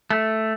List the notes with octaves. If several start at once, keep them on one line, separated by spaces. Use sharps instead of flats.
A3